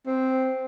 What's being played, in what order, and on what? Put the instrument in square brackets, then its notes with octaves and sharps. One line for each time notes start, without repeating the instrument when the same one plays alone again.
[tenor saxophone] C4